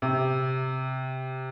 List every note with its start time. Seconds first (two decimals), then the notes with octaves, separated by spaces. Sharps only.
0.02 C3